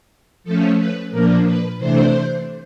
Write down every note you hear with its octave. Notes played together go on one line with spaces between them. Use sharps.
F3 A3 C#4 A4
B4
A#2 F3 A#3 D4 A#4
B4
C3 E3 A3 D4 C5